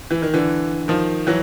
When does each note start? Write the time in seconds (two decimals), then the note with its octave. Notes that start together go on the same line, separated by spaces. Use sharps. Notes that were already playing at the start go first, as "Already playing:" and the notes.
0.11 E3
0.22 D#3
0.34 D3 E3
0.88 D#3 F3
1.27 E3 F#3